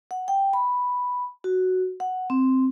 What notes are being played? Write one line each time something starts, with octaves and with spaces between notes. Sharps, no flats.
F#5
G5
B5
F#4
F#5
C4